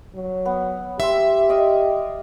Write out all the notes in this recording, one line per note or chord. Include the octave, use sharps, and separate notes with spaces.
F#3
B3
G4 E5 C6 E6
D5 D#5 F5